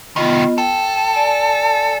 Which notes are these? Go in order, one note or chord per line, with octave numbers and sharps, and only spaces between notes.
C2 D#3 B3 F4 D#5
A4 G5
D5 G#5 A5